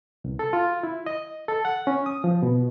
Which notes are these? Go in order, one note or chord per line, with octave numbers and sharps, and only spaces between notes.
C2
A4
F4
E4
D#5
A4
F#5
C#4
D#6
F3
B2